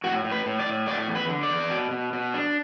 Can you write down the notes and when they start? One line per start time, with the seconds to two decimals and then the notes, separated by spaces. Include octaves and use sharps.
0.04 A2 F#4
0.24 A2
0.32 B4
0.46 A2
0.59 D5
0.66 A2
0.87 A3 D5
1.08 E2
1.15 B4
1.29 D3
1.43 D5
1.50 E2
1.70 B2
1.91 B2
2.13 B2
2.34 D4